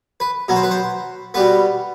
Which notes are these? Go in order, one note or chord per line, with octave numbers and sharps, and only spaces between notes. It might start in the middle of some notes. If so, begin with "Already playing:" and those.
B4
B2 F#3 B3
C5
B4
C5
B2 G3 B3 B4